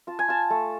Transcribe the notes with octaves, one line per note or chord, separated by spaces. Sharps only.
F4 A5
G#5
F4 A5
A3